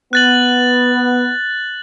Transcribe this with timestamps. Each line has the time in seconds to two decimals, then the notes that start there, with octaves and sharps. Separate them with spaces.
0.13 B3 F#6 A6 F#7